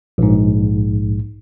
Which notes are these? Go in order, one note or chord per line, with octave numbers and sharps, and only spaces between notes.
A#1 G#2